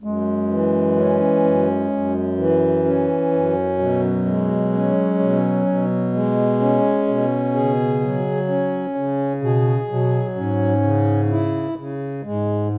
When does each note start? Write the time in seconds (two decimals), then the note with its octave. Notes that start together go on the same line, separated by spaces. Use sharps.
0.03 F#2 G#3
0.50 E3
0.97 C#4
1.44 F#2
1.91 F#2
2.38 E3
2.84 C#4
3.32 F#2
3.78 B2 F#3
4.26 G#3
4.73 C#4
5.19 B2
5.66 B2
6.14 G#3
6.60 C#4
7.07 B2
7.54 C#3 G#4
8.01 F#3
8.48 C#4
8.95 C#3
9.42 B2 G#4
9.88 B2 F#3
10.35 G#2 C#4
10.83 C#3
11.29 E4
11.76 C#3
12.23 G#2 G#3